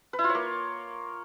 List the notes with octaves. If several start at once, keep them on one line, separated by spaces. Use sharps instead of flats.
B4
E4
F4
C#5
A#3